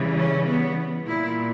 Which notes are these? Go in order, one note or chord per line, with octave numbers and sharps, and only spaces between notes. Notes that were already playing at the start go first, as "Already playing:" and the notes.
Already playing: C#3 E3 G3
C#4
B3
A#2 G3 E4